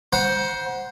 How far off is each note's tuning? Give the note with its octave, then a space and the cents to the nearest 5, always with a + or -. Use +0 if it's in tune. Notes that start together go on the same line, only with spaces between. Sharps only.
C5 +0 F#5 +0 A#5 +45